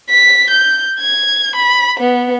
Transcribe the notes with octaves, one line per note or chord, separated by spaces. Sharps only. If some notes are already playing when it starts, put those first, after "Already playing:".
B6
G6
G#6
B5
B3